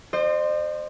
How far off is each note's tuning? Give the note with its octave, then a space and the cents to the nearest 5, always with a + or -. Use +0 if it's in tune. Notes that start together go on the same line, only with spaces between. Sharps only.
C5 +0 D#5 -45 C6 +45